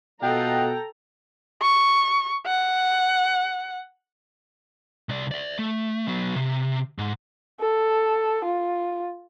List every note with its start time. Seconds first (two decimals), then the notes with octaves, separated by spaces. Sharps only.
0.22 B2 F4 A4 D#5 F#5 G5 A#5
1.62 C#6
2.46 F#5
5.09 C2 D5
5.31 D5 E5
5.59 A3
6.08 F#3 B3
6.36 C3
6.99 G#2
7.61 A4
8.45 F4